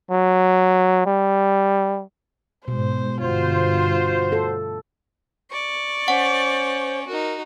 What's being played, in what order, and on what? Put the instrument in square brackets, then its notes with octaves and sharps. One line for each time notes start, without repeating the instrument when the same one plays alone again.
[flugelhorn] F#3
G3
[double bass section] G#2 [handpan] B2 [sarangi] C5
[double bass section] G1 [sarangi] F4 [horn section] F#4 C5
[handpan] A4
[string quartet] D5 C#6
[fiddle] C#4 [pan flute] C5 [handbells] F#5
[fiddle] D#4 F#4 [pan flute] A#4